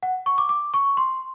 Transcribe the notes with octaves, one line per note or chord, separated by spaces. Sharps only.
F#5
C#6
D6
D6
C#6
C6